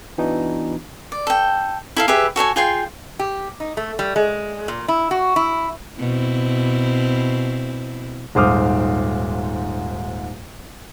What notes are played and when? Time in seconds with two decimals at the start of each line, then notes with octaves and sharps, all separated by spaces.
0.18 E3 B3 D4 D#4 F#4
1.12 D5
1.27 A4 G5
1.97 E4 A4 F5
2.08 G4 G#4 B4 E5
2.36 F#4 A4 C#5 G#5
2.56 F4 G#4 G5 C6
3.19 G4
3.60 D#4
3.77 A3
3.99 G3
4.16 G#3
4.68 A#2
4.88 E4
5.11 F#4
5.36 E4
5.99 B2 C4 E4
8.35 D#1 G#2 C5 D6 D#6 F6